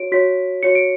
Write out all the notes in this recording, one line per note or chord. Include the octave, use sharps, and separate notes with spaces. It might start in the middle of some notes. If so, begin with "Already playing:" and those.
Already playing: F#4 C#5 D7
F#4 C#5 B6
F#4 C#5 C#7
D7